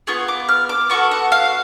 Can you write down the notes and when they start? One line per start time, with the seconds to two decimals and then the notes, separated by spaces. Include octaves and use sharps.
0.07 B3 F4 G#4 C#6
0.28 D6
0.49 F6
0.69 D6
0.90 B3 F#4 A4 C#6
1.11 F#5
1.32 F5